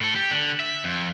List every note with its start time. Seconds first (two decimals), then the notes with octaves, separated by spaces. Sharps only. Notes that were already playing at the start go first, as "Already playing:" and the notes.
0.01 A2 A4
0.16 G4
0.31 D3
0.60 E5
0.84 F2